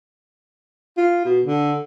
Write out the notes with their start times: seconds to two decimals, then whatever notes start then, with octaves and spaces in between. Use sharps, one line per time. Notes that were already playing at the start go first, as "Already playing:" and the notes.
0.97 F4
1.25 B2
1.46 D3